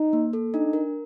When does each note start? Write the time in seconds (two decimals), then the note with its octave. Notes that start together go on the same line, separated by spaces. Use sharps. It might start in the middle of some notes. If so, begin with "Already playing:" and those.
Already playing: D#4
0.13 A#3
0.33 A4
0.54 D4 D#4
0.73 A#4